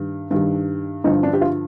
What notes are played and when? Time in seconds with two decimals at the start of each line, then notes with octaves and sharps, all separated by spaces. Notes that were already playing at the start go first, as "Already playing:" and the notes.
Already playing: G2 D#3 G3
0.31 G2 D#3 G3
1.04 G2 D3 F3 D#4
1.23 D4
1.33 G4
1.41 F4